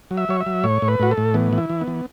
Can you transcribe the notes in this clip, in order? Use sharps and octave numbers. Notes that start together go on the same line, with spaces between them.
F#3
E5
F#3 C#5
E5
F#3
A2 C#5
A2
B4
A2 F#4
A4
A2
E3 B3
E3
E4
E3
B3
E3